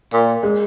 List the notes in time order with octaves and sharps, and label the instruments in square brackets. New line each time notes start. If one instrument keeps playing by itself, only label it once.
[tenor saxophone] A#2
[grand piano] G#3